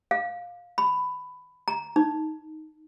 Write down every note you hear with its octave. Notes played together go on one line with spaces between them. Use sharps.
F5
B5
A#5
D#4